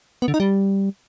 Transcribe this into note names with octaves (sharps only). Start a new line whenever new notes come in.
B3
D3
D#4
G3